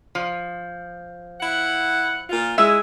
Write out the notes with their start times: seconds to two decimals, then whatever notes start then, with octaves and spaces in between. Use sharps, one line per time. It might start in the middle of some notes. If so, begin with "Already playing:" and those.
0.15 F3
1.41 E4 F#5
2.30 A#2 F4
2.58 G#3 E4 E5